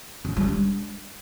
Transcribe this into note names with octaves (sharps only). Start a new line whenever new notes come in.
C#4
G3
D4